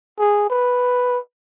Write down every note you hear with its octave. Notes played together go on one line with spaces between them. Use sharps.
G#4
B4